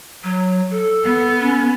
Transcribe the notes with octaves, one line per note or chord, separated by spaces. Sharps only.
F#3
A4
B3
C#4